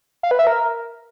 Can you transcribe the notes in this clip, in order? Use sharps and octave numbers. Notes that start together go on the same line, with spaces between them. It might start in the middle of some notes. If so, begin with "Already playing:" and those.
F5
B4
E5
A#4